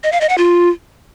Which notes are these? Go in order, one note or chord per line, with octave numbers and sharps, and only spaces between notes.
D#5
F5
D#5
F#5
F4